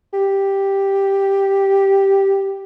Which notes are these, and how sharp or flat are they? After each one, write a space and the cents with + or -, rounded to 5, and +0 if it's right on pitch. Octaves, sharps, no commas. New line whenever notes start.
G4 +0